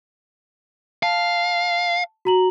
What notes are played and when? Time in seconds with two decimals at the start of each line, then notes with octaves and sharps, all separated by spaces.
1.03 F5 A5
2.25 F#4 A#5 F#7